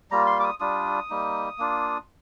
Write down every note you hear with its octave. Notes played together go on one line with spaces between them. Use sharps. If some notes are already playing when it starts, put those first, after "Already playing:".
G3 A#3 F4 A#5
C6
D6
D#6
G3 D4 F4 D#6
G3 A#3 D#4
A#3 D4 F4